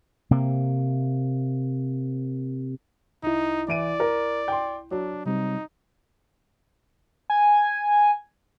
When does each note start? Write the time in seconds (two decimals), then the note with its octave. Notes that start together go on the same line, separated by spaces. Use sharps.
0.31 C3 A#3
3.23 C2 D#4 E4
3.68 E3 D5 D7 D#7
4.00 A#4
4.48 G5 C6
4.91 F#3 D4
5.26 C3 G3 C4 D#4
7.30 G#5